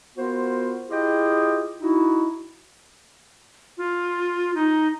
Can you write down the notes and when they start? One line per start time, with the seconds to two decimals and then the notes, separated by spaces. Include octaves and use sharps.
0.17 B3 F4 F#4 A#4 C5
0.90 E4 F4 G4 G#4 D#5 G5
1.81 D#4 E4 F#4
3.78 F4
4.55 D#4